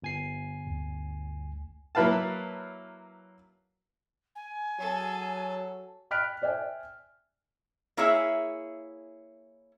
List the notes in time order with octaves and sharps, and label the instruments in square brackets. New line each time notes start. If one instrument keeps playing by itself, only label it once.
[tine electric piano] G1 G#5 C7
[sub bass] D2
[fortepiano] F#3 A#3 E4 B4 F5 A5
[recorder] G#5
[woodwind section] F#3 [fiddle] G#4 A4
[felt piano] G5 B5 F6 F#6 B6 D7
C5 D5 E5 G5 G#5
[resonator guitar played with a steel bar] A#3 E4 G#4 C#5 E5